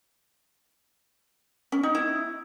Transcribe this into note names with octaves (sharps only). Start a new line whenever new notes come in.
C#4
D#4
E4